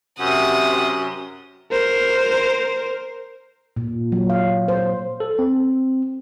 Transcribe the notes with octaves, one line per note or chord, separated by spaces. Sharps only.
F#2 C3 F#5 D#6
A#4 C5
A#2
F#3
F5
C5
A4
C4